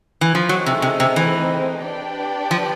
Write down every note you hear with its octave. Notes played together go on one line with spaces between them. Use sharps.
E3
F3
F#3 A3 C4 D#4 G#4 C5
C3
C3
C3
E3
D4 G4 B4 D5 G5
F3